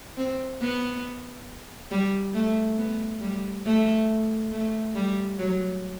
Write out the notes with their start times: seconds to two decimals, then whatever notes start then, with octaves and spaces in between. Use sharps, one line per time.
0.17 C4
0.61 B3
1.91 G3
2.34 A3
2.78 B3
3.21 G3
3.65 A3
4.52 A3
4.95 G3
5.39 F#3